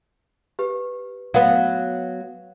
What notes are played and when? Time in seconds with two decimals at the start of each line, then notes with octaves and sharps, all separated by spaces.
0.59 G4 B4
1.34 F#3 B3 F5